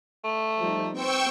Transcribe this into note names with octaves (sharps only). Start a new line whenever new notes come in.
A3
F3 G3 D#4
B3 C4 C5 G5 C#6 E6